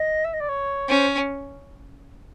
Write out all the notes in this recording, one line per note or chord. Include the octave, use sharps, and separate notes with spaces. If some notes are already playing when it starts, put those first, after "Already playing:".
Already playing: D#5
E5
D#5
D5
C#5
C#4 C5